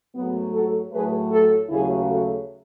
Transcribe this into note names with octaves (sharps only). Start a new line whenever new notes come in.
G#2 F#3 A3 B3
F#4 A4
A2 F#3 A3 G#4 B4
F#4 A4
D#2 C#3 F#3 A3 E4 G#4
F#4 A4